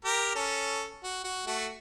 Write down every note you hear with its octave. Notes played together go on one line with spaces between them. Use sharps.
G4 A#4 A#5
C#4 A4
F#4
F#4
A3 F#4